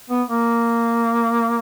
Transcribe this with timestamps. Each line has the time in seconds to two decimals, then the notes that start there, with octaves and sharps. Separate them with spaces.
0.10 B3
0.28 A#3